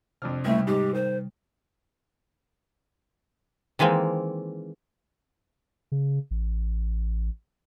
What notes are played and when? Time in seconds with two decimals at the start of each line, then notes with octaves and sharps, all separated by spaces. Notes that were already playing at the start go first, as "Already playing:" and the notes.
0.22 F2 C3 D4 F6
0.45 C#2 G3 A3 E4
0.67 G#2 D#4 G4
0.94 D#3 C5
3.79 D#3 E3 G#3 A#3 C4
5.92 C#3
6.31 A1